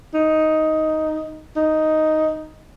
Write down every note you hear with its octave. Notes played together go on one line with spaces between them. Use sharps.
D#4
D#4